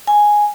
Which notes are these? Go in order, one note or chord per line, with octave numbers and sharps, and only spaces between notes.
G#5